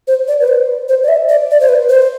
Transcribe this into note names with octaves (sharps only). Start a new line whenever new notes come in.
C5
D5
B4
C5
C5
D5
E5
D5
D5
C5
B4
C5